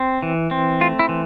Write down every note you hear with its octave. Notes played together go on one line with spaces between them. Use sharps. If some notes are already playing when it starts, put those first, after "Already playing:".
Already playing: C4
E3
C4
A3 F4
E4
E3